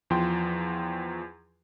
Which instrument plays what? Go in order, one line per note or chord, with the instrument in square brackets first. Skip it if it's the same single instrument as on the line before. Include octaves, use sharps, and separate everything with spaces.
[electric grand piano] E2 F3 G5 C6